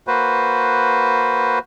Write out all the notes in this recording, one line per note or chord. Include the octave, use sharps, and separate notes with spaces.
A#3 F#4 B4 C5